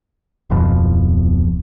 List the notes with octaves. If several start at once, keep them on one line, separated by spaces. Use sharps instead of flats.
D1 F2 B2 F3